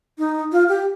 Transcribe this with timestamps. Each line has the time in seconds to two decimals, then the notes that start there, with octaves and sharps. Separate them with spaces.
0.18 D#4
0.52 F4
0.69 G4